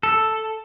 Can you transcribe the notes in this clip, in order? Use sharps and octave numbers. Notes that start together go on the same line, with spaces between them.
A4